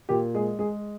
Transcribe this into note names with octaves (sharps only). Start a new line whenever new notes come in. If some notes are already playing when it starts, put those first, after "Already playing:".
A#2 G4
G#3 G#4
G#3 G#4